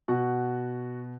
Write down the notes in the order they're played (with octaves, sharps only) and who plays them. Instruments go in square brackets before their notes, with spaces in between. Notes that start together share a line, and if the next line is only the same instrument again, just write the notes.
[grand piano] B2 F#4 F#5